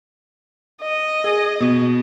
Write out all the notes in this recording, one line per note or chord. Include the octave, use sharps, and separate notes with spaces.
D#5
G#4
B2